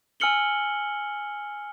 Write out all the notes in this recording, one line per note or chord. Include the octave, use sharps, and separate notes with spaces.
G#5 E6 F6 C#7 F#7 G7